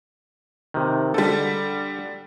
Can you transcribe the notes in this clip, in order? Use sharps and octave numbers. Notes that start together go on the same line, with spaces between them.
C3 D#3
D3 G3 A4